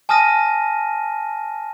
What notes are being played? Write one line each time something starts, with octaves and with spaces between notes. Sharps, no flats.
G#5 A5 D#6 F6 A#6 D#7